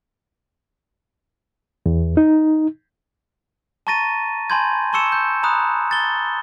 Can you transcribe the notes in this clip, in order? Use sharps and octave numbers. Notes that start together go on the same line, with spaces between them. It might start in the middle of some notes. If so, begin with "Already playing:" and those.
E2
D#4
A5 A#5 C#6 A6 A#6 D#7
G#5 A5 B5 C6 G6 G#6
A5 C6 C#6 E6 C#7 E7
G6
A#5 B5 D#6 F#6
A6 G7